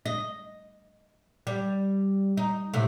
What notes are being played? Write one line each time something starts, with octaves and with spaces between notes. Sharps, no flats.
D#5
G3
D#4
A2 C3